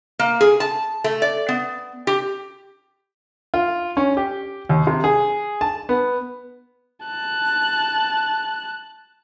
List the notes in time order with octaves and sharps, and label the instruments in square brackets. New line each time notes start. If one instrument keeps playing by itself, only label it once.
[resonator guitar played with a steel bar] A#3
G#4
A5
A3
D5
B3
G4
[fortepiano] F4
C#4
G4
D#2
C3
G#4
A5
B3
[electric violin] A5 F#6